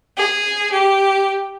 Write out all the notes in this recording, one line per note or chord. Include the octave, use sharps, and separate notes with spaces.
G#4
G4